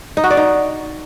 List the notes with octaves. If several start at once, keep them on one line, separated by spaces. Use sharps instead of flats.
D#4
F#4
D5
D#4